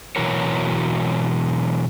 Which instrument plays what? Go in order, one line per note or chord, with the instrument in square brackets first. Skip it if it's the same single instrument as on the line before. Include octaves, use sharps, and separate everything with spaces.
[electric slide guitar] B2 E3 F#3 F#4 A#4 C#5